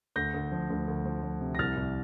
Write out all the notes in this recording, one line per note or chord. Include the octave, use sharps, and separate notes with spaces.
D2 G6 A#6
D2
F3
D2
D2
F3
F3
C3
A#6
C2 F6 A6
C2